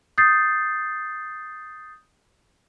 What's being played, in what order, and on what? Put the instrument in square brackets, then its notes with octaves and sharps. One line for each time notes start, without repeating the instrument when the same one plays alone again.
[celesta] D#6 G6 A6 C7